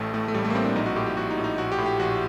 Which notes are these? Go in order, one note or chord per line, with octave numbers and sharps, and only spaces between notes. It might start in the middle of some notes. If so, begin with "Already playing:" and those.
Already playing: A1 A2 A3
A2 A3
A3
A1 G3
A3
A#3
A2 C4
D4
A#1 D#4
F#4
A2 G4
G4
A#1 F#4
D#4
A2
D#4
A#1 F#4
G4
A2
G4
A#1 F#4